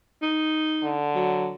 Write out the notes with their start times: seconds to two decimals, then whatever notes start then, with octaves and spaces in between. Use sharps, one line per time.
0.22 D#4
0.83 D3
1.15 F#3